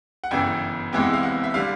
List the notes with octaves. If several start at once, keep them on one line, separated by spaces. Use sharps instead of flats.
F#5
G1 F#2 C#3 E3 G5
E2 C3 E3 G#3 G5
F#5
F5
F#5
E5
D3 G3 F5